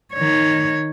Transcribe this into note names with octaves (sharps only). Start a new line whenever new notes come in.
D#3 C#5